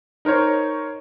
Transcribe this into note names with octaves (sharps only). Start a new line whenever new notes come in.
D#4 A#4 C5 C#5